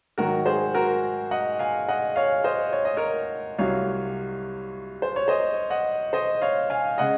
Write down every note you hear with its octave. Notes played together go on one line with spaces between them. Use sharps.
G#2 D#3 F#3 F#4 A#4
G#4 C5
F#4 A#4
D#5 F#5
F5 G#5
D#5 F#5
C#5 F5
C5 D#5
C#5
D#5
A#4 C#5
C2 C3 F#3 C#5 F5
C5
C#5
C5 D#5
D#5 F#5
C5 D#5
C#5 F5
F5 G#5
C#3 G#3 D#5 F#5